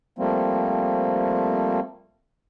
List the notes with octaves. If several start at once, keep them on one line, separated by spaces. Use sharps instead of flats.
F3 G3 A3 A#3 C4